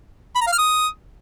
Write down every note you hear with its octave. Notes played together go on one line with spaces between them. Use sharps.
B5
A#5
F5
F6
D#6